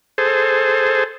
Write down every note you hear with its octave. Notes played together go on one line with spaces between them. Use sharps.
G#4 A4 C5